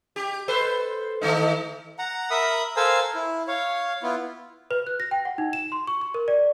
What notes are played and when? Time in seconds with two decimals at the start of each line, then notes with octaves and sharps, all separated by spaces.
0.16 G4
0.48 A4 B4 C5
1.21 D#3 A3 D#4
1.99 F#5 A#5
2.31 A#4 E5 B5 D#6
2.76 A4 A#4 C5 F5 G#5 E6
3.15 E4
3.48 C#5 F5
4.03 B3 E4 F4
4.71 B4
4.87 F#6
5.00 A#6
5.11 G5
5.25 F#5
5.38 D#4
5.53 E7
5.72 C6
5.87 C#6
6.01 C#6
6.14 A#4
6.28 D5